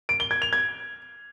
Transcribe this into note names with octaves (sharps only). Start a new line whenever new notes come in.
D7
G7
G#6
F7
G#6